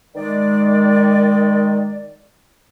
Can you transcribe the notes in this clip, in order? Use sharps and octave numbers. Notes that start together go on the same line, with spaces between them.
D#3 G#3 D5